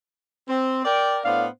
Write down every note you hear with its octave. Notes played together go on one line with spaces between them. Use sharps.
C4
A#4 D5 G5
A2 B3 D4 C5 F5